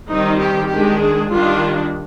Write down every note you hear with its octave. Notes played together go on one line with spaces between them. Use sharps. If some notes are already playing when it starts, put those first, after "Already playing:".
D#3 G3 C4 D#4
G4
D#3 G#3 D4 G4
G#4
D#3 G3 D4 F4